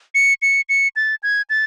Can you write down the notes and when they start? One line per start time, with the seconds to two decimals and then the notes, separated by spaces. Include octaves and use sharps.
0.15 C#7
0.42 C#7
0.69 C#7
0.96 A6
1.23 G#6
1.50 A6